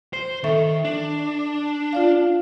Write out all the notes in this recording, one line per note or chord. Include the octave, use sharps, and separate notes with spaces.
C5
D#3 A4 E5 C#6
D4
F4 D5 F5